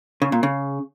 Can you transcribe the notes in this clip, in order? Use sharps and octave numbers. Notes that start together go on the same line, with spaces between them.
C#3
A#2
C#3